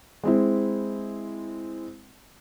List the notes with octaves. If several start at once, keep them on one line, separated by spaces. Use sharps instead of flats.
G#3 C4 E4